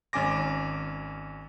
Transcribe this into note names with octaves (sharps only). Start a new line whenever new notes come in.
G#1 C#4 G#5 D6 A#6